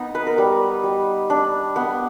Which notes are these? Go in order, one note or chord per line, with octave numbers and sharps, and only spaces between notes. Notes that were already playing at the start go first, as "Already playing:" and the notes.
Already playing: B3 D#4
B4
A#4
G3 B4
G3
D4
B3